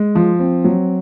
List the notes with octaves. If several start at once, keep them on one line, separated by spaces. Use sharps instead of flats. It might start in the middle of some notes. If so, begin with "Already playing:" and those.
Already playing: G#3
F3
C4
F#3